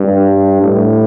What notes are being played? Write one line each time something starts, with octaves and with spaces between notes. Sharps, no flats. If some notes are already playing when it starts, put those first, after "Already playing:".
Already playing: G2
A2